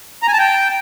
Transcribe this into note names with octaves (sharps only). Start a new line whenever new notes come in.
A#5
G#5
A5
G5